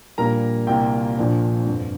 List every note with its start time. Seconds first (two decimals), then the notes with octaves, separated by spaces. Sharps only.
0.18 A#1 A#2 G3 A#3 A#4 A#5
0.67 C2 A#2 A#3 F4 G4 G5
1.17 A#1 A#2 F3 D4
1.67 G1 F2 D3